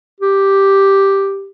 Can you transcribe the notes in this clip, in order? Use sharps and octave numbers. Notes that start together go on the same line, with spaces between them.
G4